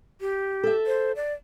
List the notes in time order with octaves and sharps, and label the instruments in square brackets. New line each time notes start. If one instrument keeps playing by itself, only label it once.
[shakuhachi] G4
[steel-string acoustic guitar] A4 E5
[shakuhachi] C5
D5